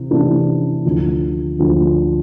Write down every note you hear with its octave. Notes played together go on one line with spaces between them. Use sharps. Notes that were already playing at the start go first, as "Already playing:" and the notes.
Already playing: C3 E3
C3 E3 A3 D4
D2 D3 F3
D2 D3 F3